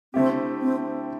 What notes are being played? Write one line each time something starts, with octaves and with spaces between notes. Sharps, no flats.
D3 A3 C4 E4 G4
C4